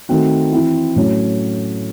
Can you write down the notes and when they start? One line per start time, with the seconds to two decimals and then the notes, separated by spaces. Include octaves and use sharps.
0.09 D#3 A3 C4 F#4
0.52 E3 C4 E4
0.96 A2 F#3 C#4